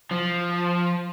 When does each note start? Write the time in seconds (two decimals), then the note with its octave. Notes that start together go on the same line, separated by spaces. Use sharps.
0.11 F3